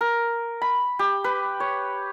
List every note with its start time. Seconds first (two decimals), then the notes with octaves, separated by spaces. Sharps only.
0.01 A#4
0.62 B5
0.99 G4
1.24 B4
1.60 C#5